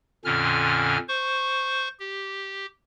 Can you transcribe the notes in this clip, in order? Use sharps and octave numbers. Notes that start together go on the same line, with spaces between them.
F2 A#2 D3 C#4 F6
C5 C#6
G4